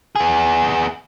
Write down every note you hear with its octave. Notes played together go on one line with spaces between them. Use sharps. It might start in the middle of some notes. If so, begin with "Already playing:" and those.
B3 G#4